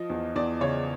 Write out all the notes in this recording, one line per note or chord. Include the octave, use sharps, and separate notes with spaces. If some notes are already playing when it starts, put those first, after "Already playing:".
Already playing: F3 D#5
E2
E2 D5
C#3 C#5